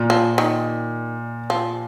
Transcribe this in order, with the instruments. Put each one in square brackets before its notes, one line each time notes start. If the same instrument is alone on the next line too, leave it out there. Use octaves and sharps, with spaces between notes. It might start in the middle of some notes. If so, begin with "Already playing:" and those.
Already playing: [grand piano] A#2
[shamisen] F3
D#3
F3